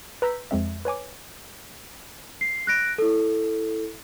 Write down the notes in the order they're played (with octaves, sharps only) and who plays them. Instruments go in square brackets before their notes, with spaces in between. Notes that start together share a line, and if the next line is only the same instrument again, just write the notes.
[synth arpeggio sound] B4 A#5 E6 G6 B6
F2 G#3 C4 E5
B4 C#5 G#5 D6
[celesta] C7
F#6 A#6 D7
E4 A4